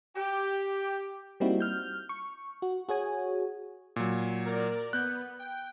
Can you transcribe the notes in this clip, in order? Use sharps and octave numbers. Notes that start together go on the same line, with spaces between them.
G4
G3 A#3 C4 D#4 E4 F#4
F6 G6
C#6
F#4
F#4 G#4 C#5 G#5
A#2 F#3
A#4 D5
B3 F#6 G6
G5